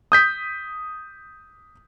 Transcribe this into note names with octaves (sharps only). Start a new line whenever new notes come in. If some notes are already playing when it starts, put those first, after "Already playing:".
D#6 G6 B6